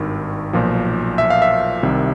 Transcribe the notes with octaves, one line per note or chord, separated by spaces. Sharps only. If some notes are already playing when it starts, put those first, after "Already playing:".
Already playing: G#1 G2 D#3
B1 A#2 F3
E5
F5
E5
C2 C3 D#3